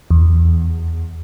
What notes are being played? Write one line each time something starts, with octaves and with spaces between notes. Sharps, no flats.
E2